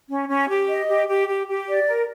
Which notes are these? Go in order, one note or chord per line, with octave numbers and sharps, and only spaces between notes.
C#4
C#4
G4
D#5
G4
G4
G4
G4
D5
A#4